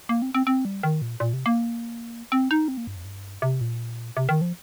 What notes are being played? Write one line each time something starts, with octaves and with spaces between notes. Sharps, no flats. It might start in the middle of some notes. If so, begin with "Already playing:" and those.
A#3
C4
C4
C4
G3
D#3
A#2
A#2
C3
A#3
C4
D#4
C4
A#3
G2
F2
G2
C3
A#2
C3
D#3
F3